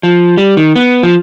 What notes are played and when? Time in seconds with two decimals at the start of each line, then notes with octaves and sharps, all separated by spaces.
0.03 F3
0.37 G3
0.57 D#3
0.75 B3
1.03 F3